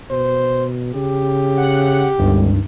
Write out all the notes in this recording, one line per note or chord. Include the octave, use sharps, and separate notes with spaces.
B2 C5
C#3 G4
F#5
G1 C#2 G2 D#3